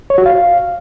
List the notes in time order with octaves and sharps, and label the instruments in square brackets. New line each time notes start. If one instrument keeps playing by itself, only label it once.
[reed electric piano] C#5
F#4
F5